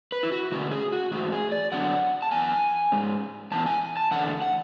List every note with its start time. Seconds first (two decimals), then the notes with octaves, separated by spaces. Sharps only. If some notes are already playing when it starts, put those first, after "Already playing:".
0.12 B4
0.23 E4
0.32 F#4
0.52 D3 A3 C#4 F#4
0.71 G#4
0.92 F#4
1.11 G#2 E3 A3 F#4
1.32 G#4
1.52 D5
1.72 F#2 D3 F#3 B3 D4 F#5
2.22 A5
2.32 F#2 E3 B3 G#5
2.92 G#2 G#3 C#4
3.51 G#2 E3 B3 A5
3.66 G#5
3.97 A5
4.11 E2 D3 A3 D4 F#5
4.42 F#5